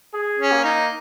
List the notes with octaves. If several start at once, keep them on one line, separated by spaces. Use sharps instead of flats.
G#4
C#4
A#3
D#4